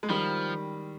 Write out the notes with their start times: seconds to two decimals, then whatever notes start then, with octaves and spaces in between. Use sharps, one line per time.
0.03 G#3
0.09 D#3 F3 G3